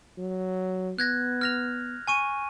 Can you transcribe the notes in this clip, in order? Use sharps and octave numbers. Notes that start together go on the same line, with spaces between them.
F#3
B3 F#6 G#6 A#6
F6 A#6 F7
G#5 C#6 D#7